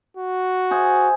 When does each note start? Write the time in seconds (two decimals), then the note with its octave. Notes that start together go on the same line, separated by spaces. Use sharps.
0.17 F#4
0.71 G#4 C5 E5